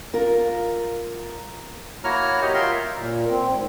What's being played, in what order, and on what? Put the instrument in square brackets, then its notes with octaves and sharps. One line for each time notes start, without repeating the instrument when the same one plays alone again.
[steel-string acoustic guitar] F4 A#4
[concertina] A#3 E4 F#4 C#5 A#5 F6
G4 C#5 D#5
F4 A#4 E5 C6
[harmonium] A#2
C4
G#2